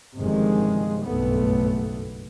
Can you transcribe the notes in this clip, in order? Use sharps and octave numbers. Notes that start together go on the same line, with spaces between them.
G1 C3 D#3 F3 G#3
F#1 B1 G2 A3 B3